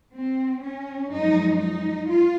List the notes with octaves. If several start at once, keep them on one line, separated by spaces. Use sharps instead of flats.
C4
C#4
F#2 F3 G#3 D#4
D#4
F4